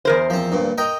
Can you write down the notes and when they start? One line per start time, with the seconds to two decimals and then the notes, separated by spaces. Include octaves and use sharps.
0.05 E2 A#4 C5
0.30 F3 C4
0.52 G2 A#2
0.78 A#4 D#5 G5